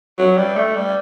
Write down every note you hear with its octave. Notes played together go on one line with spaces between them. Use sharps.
F#3
G3
A3
G3